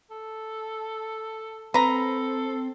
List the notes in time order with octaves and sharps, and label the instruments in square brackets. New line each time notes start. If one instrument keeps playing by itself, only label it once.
[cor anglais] A4
[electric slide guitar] C4 [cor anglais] A4 [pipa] B4 A#5